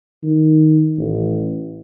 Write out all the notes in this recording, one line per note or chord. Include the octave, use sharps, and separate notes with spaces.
D#3
A1